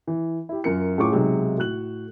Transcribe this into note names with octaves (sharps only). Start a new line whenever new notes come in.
E3
E4 G4
F#2 F4 A#4 C#7
A2 C#4 F4 G#4 C#6 D6
B1 C3 F#3 G#3
A2 F#4 F#6 F#7